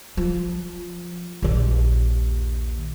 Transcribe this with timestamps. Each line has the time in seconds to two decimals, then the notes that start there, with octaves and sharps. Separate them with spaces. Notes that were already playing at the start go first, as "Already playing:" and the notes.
0.17 F3
1.42 A#1 D#2